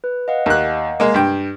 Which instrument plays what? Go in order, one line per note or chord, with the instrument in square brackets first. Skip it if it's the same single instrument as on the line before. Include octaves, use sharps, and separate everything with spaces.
[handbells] B4
D#5 F5 F#5
[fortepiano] D#2 F#6
G#3 A#3
G2 G5